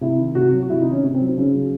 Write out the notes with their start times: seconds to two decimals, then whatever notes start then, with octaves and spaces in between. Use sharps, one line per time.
0.01 C3 E4
0.19 D#3
0.35 C3 F#4
0.52 F#3
0.62 F#4
0.69 C3 E4
0.81 D#3 D#4
0.92 C#4
1.03 C3
1.14 C4
1.20 F#3
1.28 D#4
1.37 C#3 C#4
1.54 F#3